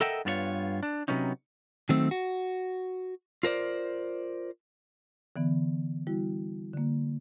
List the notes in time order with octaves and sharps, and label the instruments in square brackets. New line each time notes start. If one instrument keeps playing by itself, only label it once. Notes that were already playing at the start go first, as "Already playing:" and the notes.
[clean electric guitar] A4 A#4 D#5 E5 F#5 G5
G2 B3 F4 G4 C#5
D4
C3 F3 F#3 B3 C#4 D#4
D#3 F#3 A3 C4
F#4
F4 A#4 C5 D5
[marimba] D3 E3 B3
G3 E4 F#4
D3 A#3